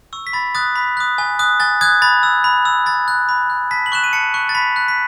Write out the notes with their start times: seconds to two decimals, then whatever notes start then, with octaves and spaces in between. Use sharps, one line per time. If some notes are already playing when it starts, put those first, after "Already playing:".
0.13 C#6 E6
0.27 B6
0.33 B5 A6
0.55 D#6 F#6 A6
0.76 B5 B6
0.97 D#6 F#6
1.18 G#5
1.39 D#6 F#6
1.60 G#5 A6
1.81 D#6 F#6 G#6
2.02 B5 A6
2.23 E6
2.44 B5
2.65 E6
2.86 B5 A6
3.08 F#6
3.29 B5
3.50 F#6
3.71 A5 B6
3.86 F#7
3.92 C#6 F#6 E7
4.04 D#7
4.13 A5 C#7
4.34 C#6 F#6
4.49 A6
4.55 B5 B6
4.76 F#6
4.88 B6